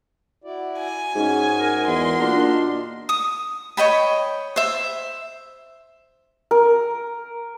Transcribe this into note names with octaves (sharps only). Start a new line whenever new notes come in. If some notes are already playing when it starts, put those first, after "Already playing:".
E4 F#4 D5
G#5
G#2 C#4 D#4 F#4
A#4
E2 C6
A#2 D4
D#6
C#5 D#5 G5 B5
C5 E5
A#4